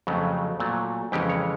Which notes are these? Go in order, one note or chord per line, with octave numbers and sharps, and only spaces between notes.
F2 C#3 F#3 A3
A#2 F#3 A3
F2 C#3 E3 G#3 C#4 G4
C#5